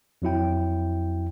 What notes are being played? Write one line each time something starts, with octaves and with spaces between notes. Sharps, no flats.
F2 F#3 E4 G5